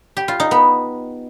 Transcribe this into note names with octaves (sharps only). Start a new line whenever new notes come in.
G4
F4
D#4
B3